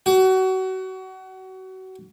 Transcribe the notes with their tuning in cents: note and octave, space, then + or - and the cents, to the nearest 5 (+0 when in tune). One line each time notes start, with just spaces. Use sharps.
F#4 +30